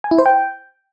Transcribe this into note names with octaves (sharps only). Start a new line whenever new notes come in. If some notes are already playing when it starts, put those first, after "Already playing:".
G#5
E4
C5
G5